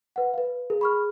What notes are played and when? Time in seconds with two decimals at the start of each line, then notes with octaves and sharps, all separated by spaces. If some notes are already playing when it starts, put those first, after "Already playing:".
0.16 B4 F#5
0.34 B4 F5
0.70 G#4 A#4
0.81 B5 C#6 F6